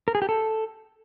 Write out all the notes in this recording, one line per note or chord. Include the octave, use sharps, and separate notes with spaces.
A#4
G#4
G4
A4